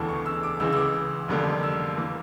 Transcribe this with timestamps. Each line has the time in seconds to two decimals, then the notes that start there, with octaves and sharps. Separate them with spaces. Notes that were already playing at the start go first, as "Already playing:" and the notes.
Already playing: E1 D2 C#3 E3 A3 A5
0.08 C#6
0.26 E6
0.43 D6
0.60 C#2 C#3 E3 E6
0.72 E6
0.77 D6
1.28 F1 F2 D3 G3 A#3
1.63 E6
1.97 E3 A#3